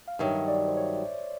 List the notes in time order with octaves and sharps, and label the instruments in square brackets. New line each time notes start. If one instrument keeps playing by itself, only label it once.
[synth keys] F5
[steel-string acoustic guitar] G2 D#3 F#3 [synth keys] E5
[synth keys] D5
C5
C#5